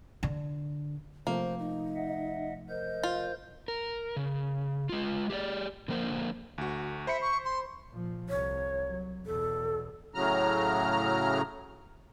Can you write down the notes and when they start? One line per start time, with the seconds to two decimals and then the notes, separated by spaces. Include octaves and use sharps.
0.23 D3
1.27 C3 F3 A3 A#3 C5
1.59 D#4
1.96 D#5 E5 F#5
2.69 A#4 C5 D#5 G6
3.03 F4
3.68 A#4
4.17 C#3
4.89 G#3 F4
5.30 G4 G#4 C#5 D5
5.88 D3 F3 A#3 A#4 C5
6.58 D2 F#4
7.07 C5 E5 B5 C#7
7.21 C#6
7.45 C6
7.89 A#2 F3
8.29 C2 C#5
8.88 F#3
9.26 E2 B2 A4
10.15 A2 C#3 F#3 A#5 F6